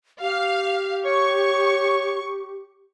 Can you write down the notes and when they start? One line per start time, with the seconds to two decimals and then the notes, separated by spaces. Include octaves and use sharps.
0.21 G4 F5
1.05 C#5 C#6